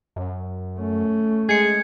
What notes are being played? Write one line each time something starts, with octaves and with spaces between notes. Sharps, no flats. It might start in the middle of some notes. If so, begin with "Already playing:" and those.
F#2
A3 C#4
G#3 G#4 G#6 C#7